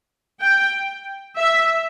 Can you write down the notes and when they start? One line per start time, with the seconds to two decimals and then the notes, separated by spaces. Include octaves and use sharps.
0.41 G5
1.37 E5